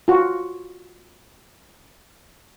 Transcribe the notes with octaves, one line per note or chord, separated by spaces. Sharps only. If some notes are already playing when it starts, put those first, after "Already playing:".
F4 F#4